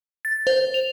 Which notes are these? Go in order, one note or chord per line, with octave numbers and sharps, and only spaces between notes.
A6
C5
F7